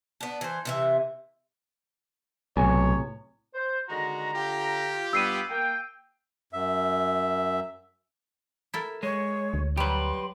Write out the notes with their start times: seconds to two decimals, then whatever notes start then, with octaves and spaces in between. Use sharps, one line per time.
0.21 B3 D4
0.41 E3 C5
0.65 C3 E3 E5
2.57 B1 A2 C3 C#5 G#5
3.54 C5
3.89 D3 D#3 G#3 F#4 A#5
4.34 F4 G4
5.13 G2 G3 B3 E6 C7 D#7
5.50 A#3 G5
6.53 F#2 E5
8.74 E4 A4 A#4
9.03 G#3 C#5
9.54 D2
9.77 F#3 G3 G4 B4 C6